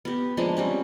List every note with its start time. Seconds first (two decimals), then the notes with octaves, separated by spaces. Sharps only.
0.05 B3 G4
0.37 F3 G#3 A#3 D4
0.57 G3 C4 C#4